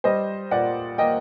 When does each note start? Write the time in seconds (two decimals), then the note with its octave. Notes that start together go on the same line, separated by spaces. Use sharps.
0.04 G3 C5 D#5
0.51 A#2 D5 F#5
0.98 A#3 D#5 G5